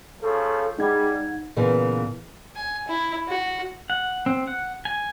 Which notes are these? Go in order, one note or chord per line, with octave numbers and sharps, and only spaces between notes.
C#3 F3 A3 A4
G3 G#3 D#4 F#5 G#6
A#2 C#3 E3 A#3 B3
G#5
E4
F#4
F#5
C4
F#5
G#5